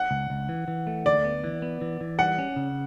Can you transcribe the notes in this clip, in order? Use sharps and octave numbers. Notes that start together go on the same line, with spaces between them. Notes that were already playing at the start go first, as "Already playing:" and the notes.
Already playing: F#5
C#2
C#2
E3
E3
A3
D2 D5
B3
E3
B3
E3
E3
G3 F#5
C#4
C#3